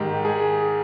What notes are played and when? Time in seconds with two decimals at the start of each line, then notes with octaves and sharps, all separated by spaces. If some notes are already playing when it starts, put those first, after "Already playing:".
Already playing: G#2 D#3 G4
0.25 G#4